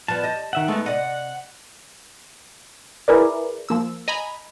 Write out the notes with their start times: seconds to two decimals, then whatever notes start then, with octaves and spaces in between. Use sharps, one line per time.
0.08 F3 G3 B3 A5
0.23 G4 D#5
0.53 D#3 E5 F#5
0.68 G#3 A3 B3 D#4 A4
0.86 C3 D5 D#5 F#5
3.08 E4 G#4 A#4 B4 D5
3.69 F3 A#3 E6
4.08 D#5 G#5 A#5 B5